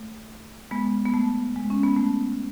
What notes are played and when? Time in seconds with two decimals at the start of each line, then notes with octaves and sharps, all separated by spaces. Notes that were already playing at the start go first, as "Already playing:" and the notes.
Already playing: A3
0.71 G#3 B3
1.06 B3
1.14 A3
1.56 G#3
1.70 C#4
1.83 B3
1.97 A3